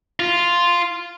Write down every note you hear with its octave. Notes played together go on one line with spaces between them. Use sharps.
F4